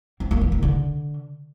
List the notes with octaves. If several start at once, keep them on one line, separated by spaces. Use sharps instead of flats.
C4
A#3
E3
D#3
D3